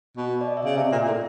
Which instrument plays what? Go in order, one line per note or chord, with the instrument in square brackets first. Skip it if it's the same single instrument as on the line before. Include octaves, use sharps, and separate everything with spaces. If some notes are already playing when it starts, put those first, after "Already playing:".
[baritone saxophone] B2
[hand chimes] D5
D#5
E5
[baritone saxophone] C#3 [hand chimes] D#5
[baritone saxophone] C3 [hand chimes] D5
[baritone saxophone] A#2
[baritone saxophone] A2 [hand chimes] E5